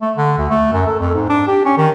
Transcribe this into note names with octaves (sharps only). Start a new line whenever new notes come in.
A3
D3
D2
A3
F#2
A4
F2
G#2
D4
G4
C#4
D#3